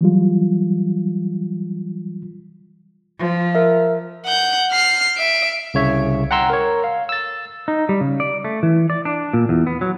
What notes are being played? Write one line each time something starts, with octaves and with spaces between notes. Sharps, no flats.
E3 F#3 G3 F4
F3
A#4 E5
F#5 G6
F6 C7
E5 D7
C2 C#3 C#5 E5
F#5 G5 A#5 C6 E6
A#4 C#5
F5
E6 A6
D#4
G3
C#3
D5
A3
E3
D5
D4
A#2
E2
B3
F#3